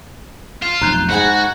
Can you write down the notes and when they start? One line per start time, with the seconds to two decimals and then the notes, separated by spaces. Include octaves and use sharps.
0.62 F4 E7
0.81 F1 B1 C5 A#5 F#6 G6
1.10 G#2 F#4 G#4 F#5 B5